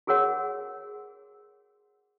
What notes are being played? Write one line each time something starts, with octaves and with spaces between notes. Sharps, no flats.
F#4 G#4 A#4 C#5 F#5